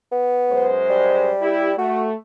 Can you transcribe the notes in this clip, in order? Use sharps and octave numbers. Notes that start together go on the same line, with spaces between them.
B3
F#2 G#3 C5
G3
E4 G4
A3 F#4